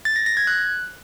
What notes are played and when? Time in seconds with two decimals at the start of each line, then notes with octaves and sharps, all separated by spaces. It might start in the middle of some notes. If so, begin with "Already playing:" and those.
0.05 A6
0.16 A#6
0.26 A#6
0.37 G#6
0.47 F#6